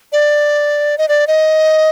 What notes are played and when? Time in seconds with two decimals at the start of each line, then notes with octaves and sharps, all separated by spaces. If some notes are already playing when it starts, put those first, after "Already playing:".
0.12 D5
0.98 D#5
1.08 D5
1.27 D#5